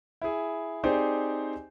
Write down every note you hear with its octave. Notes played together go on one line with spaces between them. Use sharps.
E4 G#4
C4 D#4 G4 G#4 C5 D5